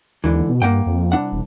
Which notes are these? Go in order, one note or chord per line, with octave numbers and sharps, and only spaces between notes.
D#2 G#2 D3 E3
B2
G2 A#3 F#5 G5
F2
C2 D4 F#5
E1